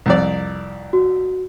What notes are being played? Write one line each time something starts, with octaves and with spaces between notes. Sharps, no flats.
C2 F2 D5
F#4